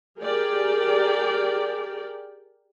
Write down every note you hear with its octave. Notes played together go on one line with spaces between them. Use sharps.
G4 G#4 A#4 D5 G5